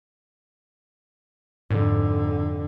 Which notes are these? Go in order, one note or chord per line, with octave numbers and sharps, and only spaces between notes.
F2 G#2 D3